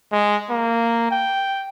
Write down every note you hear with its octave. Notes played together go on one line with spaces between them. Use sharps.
G#3
A#3
G5